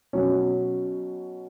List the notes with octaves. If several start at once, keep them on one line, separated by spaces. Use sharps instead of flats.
B2 F#3 C#4